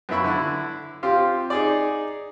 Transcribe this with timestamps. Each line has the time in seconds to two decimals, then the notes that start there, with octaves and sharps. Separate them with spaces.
0.09 F#2 B3 E4 E5 B5 C#6
0.24 D3 E4
1.03 C4 F4 G4 F5
1.50 D#4 G#4 D5